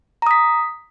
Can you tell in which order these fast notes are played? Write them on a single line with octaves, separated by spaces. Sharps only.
A#5 D#6 B6